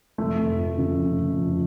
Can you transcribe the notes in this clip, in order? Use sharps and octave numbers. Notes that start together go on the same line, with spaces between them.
F1 A3
F1
F2
C#3
F1
F1
F2